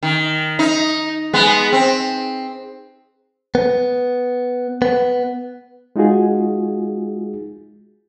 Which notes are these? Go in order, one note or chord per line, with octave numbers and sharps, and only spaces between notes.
D#3
D#4
G#3 B3
C4
B3
B3
G#3 D#4 F4 F#4 G#4